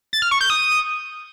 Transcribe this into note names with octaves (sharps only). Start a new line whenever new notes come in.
A6
F6
C#6
G6
D#6